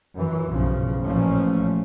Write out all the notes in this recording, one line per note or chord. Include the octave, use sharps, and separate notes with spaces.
F#2 E3
B1 G2 C#3 F3
A1 A#2 F3 A3 C#4